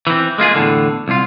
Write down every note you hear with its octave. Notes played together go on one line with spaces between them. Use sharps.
E3 C4
G#3 A#3 F4 G#4
E2 A2 D3
C2 F4